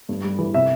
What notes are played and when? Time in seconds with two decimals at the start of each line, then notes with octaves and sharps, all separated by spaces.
0.09 G2
0.24 G3
0.39 E3
0.54 C3 E5